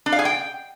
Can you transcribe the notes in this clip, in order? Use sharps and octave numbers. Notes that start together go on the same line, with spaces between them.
D4
F5
G#4
G5